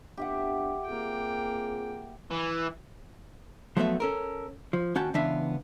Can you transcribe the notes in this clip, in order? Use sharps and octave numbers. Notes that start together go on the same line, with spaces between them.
F2 B3 D4 G4 E5 F#5
A#3 C4 F4 G#4 G5
E3
F3 F#3 A3 B3 E5
C#4 A4 A#4
F3
D#2 C#4 F#4 G5 A5
C#2 E3 B3 D4 E5 F5